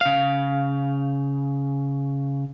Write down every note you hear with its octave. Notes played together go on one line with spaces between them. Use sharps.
C#3 F5